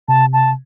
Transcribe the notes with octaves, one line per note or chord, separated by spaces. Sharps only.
C3 A5
A5